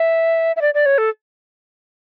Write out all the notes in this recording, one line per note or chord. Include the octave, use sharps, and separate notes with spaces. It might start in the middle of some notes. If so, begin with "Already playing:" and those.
Already playing: E5
E5
D5
D5
C#5
A4